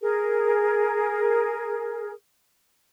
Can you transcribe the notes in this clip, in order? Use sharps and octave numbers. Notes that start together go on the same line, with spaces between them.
G#4 A#4